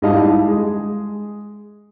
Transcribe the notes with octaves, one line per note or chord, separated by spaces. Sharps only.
G#2 G3 E4 D#5 F5 A5
G#3